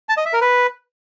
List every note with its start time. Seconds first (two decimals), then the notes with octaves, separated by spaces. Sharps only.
0.09 A5
0.17 D#5
0.25 E5
0.33 A#4
0.41 B4